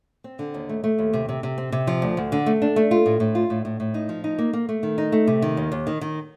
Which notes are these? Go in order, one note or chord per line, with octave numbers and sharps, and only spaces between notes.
C4
D3
D#2
A3
A3
D#2
C3
C3
C3
C4
C3
F3
D2
D2
D3
A3
D4
A3
F4
A2
A2
F4
A2
A2
A2
D#4
F3
D#4
A#3
A#3
A3
D#3
D#4
A3
C3
D#3
D#2
D#2
D#3
D#3